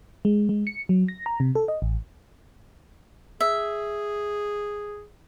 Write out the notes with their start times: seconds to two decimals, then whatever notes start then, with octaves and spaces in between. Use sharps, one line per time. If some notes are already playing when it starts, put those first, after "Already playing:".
0.25 G#3
0.49 G#3
0.67 C#7
0.89 F#3
1.08 A#6
1.26 A#5
1.40 C3
1.55 A4
1.68 D#5
1.82 A1
3.40 G#4 E5